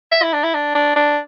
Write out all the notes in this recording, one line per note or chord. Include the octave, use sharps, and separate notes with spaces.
E5
E4
D4
E4
D4
D4
D4